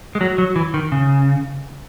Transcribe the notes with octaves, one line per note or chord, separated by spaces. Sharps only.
G#3
F#3
F#3
E3
D#3
C#3